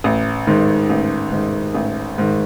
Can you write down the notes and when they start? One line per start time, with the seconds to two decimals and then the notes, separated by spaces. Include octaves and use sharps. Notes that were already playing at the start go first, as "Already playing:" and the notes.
0.04 A1
0.47 G#2 D#3
0.89 A1
1.32 G#2 D#3
1.75 A1
2.18 G#2 D#3